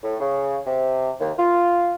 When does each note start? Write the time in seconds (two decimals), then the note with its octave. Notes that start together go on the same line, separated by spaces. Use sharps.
0.04 A2
0.20 C#3
0.67 C3
1.20 D#2
1.39 F4